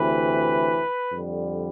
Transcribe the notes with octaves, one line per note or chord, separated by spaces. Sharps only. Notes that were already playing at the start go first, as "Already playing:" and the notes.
Already playing: D2 C3 E3 B4
F2 D3 G3